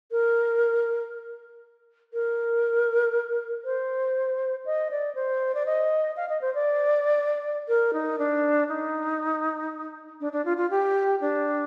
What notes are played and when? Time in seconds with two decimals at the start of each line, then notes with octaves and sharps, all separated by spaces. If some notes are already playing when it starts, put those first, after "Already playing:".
0.12 A#4
2.14 A#4
3.65 C5
4.66 D#5
4.91 D5
5.15 C5
5.55 D5
5.66 D#5
6.17 F5
6.29 D#5
6.42 C5
6.55 D5
7.68 A#4
7.93 D#4
8.19 D4
8.69 D#4
10.20 D4
10.32 D4
10.45 F4
10.57 F4
10.70 G4
11.21 D4